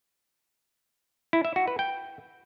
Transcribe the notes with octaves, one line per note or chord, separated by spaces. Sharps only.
E4
E5
F#4
B4
G5